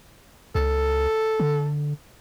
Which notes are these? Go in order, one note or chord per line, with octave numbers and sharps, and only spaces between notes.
C#2 A4
D3